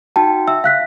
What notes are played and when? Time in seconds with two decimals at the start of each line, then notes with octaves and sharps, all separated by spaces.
0.16 D#4 F#4 G5 A5
0.48 E5 E6
0.64 F5 F#6 B6